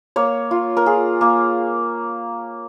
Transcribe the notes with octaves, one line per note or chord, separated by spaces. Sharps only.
A#3 C#5
F4
A#4
F4 G#4
A#3